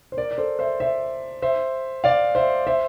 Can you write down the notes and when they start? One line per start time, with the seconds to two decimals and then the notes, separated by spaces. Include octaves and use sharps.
0.12 C5
0.17 A#4 D5
0.31 D5
0.38 A4 C5
0.59 C5 E5
0.80 C5 E5
1.42 C5 E5
2.04 D5 F5
2.35 C5 E5
2.67 C5 E5